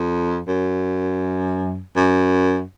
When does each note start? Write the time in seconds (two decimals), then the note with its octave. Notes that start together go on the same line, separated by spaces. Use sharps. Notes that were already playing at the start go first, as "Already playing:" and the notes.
Already playing: F2
0.47 F#2
1.96 F#2